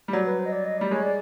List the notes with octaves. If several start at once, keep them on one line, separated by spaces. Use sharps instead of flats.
G3
F#3 D5
B4
C5
D#5
D5
D#5
G3 D5
G#3 C#5
D5